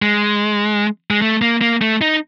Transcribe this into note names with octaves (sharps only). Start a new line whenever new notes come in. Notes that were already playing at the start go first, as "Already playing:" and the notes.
G#3
G#3
A3
A#3
A#3
A3
D#4